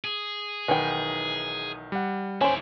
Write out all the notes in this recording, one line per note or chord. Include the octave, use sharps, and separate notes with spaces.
G#4
B1 D#3 E3 F#5 G5
G3 F#5
D#2 C#4 E4 C5 D5